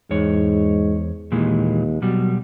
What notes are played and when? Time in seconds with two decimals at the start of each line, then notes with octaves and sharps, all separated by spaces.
0.11 E2 G#2 C#5
1.32 D#2 A#2 E3 G#3
2.02 B2 F#3 G3